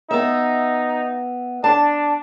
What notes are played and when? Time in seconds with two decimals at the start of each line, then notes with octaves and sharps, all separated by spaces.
0.11 B3 D#4 E5
1.64 D4 A5